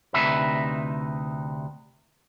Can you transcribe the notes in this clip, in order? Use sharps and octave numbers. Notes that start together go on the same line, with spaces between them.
D2 C3 D#4 B4 E5